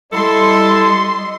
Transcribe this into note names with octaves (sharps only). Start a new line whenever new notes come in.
G3 E4 A4 D#5 C6